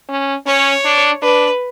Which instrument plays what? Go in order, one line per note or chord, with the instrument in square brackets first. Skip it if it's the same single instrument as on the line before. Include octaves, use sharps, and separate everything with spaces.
[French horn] C#4
[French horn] C#4 [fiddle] C#5
[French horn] D4
[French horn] D4 [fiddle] B4